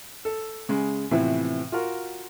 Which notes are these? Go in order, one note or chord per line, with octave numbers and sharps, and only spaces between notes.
A4
C#3 G#3
A2 C3 E3 F3 B3
F4 F#4 A#4